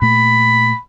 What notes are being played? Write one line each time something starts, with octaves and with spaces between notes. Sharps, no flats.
A#2 A3 B5